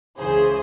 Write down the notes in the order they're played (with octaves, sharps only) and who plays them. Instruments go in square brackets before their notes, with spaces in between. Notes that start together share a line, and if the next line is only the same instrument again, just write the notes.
[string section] C#2 C#3 E3 G#4 C5